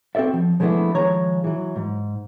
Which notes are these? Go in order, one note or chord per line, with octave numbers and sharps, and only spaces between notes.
C4 F#4 A4 D5 E5
F3
F3 G#3 A3 B3 D4 E4
D#3 F3 G#3 C#5 A#5
E3 F#3
G#2